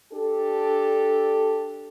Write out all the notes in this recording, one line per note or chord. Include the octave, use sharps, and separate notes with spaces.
D4 G4 A4